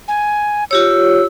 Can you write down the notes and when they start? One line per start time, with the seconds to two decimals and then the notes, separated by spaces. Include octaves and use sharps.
0.08 G#5
0.71 F4 G4 C#5 E6